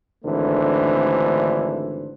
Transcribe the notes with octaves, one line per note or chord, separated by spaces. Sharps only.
G#1 D3 E3 A3 D4 C5